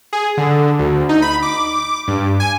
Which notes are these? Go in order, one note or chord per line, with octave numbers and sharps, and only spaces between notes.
G#4
D3
D2
D#4
B5
D6
G2
G#5